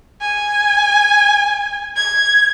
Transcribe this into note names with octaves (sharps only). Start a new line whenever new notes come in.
G#5
G#6